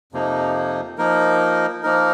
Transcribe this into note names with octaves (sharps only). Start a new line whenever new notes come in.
F2 C3 F3 A#3 D#4
F3 A#3 D#4 A#4
F3 A#3 D#4 A#4